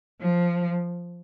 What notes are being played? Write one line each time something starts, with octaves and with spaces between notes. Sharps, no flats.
F3